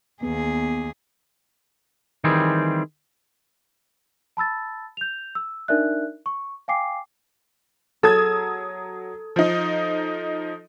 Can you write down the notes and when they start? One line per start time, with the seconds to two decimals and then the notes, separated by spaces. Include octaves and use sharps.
0.23 D#2 B3 G#4
2.24 D#3 E3 G3 C4 G4 G#4
4.37 A5 B5 E6 A6
4.97 G6 F7
5.35 E6
5.68 D4 D#4 A#4 D5 E5 F#6
6.26 C#6
6.68 F5 G5 G#5 D6 C7
8.03 F#3 A4 D#6 G#6
9.36 F3 D#4